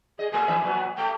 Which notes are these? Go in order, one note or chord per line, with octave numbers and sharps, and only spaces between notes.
G#4 D#5
B2 A3 G#5
F2 E3 E5
A#2 F#3 B3
A3 G5